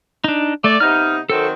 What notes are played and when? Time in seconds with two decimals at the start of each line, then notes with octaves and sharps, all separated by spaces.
0.24 D4 D#4
0.64 A3 D5
0.80 C3 B3 D#4 F6
1.29 D#3 F#3 C4 A4